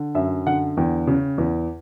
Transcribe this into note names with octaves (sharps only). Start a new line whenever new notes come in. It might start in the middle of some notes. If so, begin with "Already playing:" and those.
Already playing: D3
F#2 E5
D3 F#5
E2 G5
C#3
E2